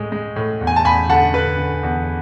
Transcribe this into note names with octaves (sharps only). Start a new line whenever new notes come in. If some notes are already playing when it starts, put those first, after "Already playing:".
Already playing: A2 G#3
G#3
A2
E2
G#5
A5
E2 G#5 B5
D3 F#5 A5
D3 B4
D3
E2